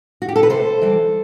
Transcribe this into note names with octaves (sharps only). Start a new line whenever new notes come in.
F#4
G4
A4
B4
C3 A4 C5
E3 G3